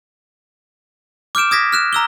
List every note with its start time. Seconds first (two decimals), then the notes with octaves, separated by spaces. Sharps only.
1.35 D6 F6 G6 D7 E7
1.51 D#6 G#6 A#6 B6
1.72 F6 F#6 E7
1.93 A#5 E6 G7